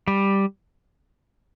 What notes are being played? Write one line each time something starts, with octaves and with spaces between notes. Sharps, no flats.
G3